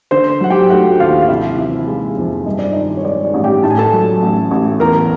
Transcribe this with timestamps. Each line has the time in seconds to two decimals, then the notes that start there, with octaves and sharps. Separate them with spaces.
0.11 D3 C5 C6
0.40 F#3 F#5
0.50 G4 G5
0.70 A3 F#4 F#5
0.99 D#2 F4 F5
1.21 F5
1.28 C3 E4 E5
1.58 E3
1.87 G#3
2.17 F2
2.46 G2 D#5
2.59 D5
2.72 D#3 D#4 D#5
2.97 C#5
3.05 G#3 D5
3.25 D5
3.34 A1
3.44 G4 G5
3.63 A2 A5
3.70 G#5
3.79 A4 A5
3.93 F#3
4.22 A1
4.51 A1
4.80 E2 A#4 A#5